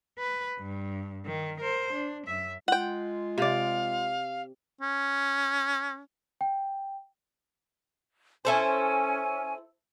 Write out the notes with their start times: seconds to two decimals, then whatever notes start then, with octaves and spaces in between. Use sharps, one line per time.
0.19 B4
0.59 G2
1.26 D#3
1.61 A#4 C5
1.93 D4
2.27 F#2 E5
2.68 G#3 F4 F#5 G5
3.38 C3 D5 F5
4.81 C#4
6.41 G5
8.45 C#4 E4 A4 C5 G#5